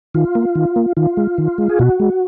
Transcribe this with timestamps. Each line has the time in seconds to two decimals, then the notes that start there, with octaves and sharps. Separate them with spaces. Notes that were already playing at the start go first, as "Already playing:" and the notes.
0.14 D#3 F4
0.35 A#3
0.55 D#3
0.76 A#3
0.97 D#3 F4
1.17 G#3
1.38 D#3
1.58 G#3
1.69 G#4
1.79 B2 F#4
2.00 G#3